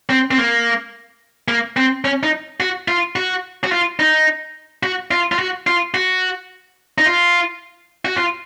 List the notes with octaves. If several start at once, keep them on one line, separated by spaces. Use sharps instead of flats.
C4
C4
A#3
A#3
C4
C#4
D#4
F#4
F4
F#4
F#4
F4
D#4
F#4
F4
F4
F#4
F4
F#4
D#4
F4
F#4
F4